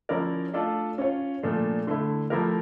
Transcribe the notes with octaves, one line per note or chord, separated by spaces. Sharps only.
F3 C#4 E4 A#4 D5
A3 D4 F4 A4 D5
C#4 F4 C#5
A#2 F3 A3 D4
D3 A3 E4
F3 A3 E4 G4 A#4